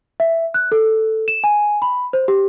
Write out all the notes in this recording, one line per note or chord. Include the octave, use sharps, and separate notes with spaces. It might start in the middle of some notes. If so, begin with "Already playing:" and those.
E5
F#6
A4
E7
G#5
B5
C5
G4